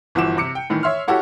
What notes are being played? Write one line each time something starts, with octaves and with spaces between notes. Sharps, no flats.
G1 E3 F3 F#4 D6 E7
C3 D6 C#7
G5
A2 D#3 E3
C#5 E5 C6 F6
E4 F#4 G4 A4 C#5